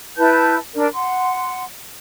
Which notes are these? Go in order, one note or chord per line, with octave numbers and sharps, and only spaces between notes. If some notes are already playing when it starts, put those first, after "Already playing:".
E4 B4 A5 G6
D4 A#4 D5
F#5 C6